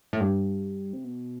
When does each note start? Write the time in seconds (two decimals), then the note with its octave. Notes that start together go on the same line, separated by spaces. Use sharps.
0.13 A2
0.20 G2
0.93 C3
1.04 B2